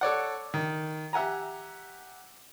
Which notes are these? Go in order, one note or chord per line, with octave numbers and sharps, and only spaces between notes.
A4 C#5 D5 F#5
D#3
G4 E5 F#5 G#5 A#5